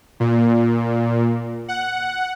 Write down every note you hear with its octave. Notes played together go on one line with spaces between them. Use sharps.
A#2
F#5